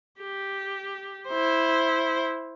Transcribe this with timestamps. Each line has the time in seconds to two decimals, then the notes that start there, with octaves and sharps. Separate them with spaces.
0.21 G4
1.29 E4 C5